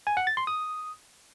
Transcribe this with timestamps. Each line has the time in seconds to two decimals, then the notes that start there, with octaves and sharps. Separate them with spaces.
0.07 G#5
0.17 F#5
0.27 A6
0.37 C6
0.47 D#6